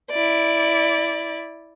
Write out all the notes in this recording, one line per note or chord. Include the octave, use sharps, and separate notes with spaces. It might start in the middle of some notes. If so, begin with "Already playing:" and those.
E4 D5